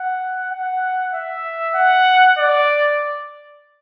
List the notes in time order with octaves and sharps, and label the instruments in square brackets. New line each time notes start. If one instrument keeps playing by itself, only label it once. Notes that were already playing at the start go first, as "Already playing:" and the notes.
Already playing: [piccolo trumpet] F#5
F#5
E5
F#5
D5